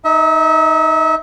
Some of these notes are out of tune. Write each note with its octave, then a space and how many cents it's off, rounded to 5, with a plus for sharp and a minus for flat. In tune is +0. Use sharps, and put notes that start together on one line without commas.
D#4 +0 E5 -35